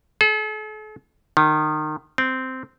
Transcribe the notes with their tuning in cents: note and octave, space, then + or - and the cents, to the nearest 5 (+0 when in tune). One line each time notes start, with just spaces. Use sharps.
A4 -45
D#3 -25
C4 -10